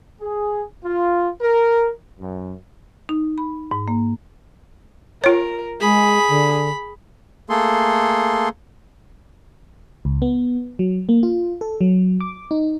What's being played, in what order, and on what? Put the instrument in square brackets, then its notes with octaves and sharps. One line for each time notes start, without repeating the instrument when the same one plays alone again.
[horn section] G#4
F4
A#4
F#2
[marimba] D#4
B5
G#2
A#3
[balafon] F4 C#5 [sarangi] A#4
[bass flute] G#3 [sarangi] G#4 [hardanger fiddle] B5
[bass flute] D3
[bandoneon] A3 A#3 G#4 A4 C6
[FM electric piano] C#2
B3
F#3
A#3
F4
A4
F#3
D6
D#4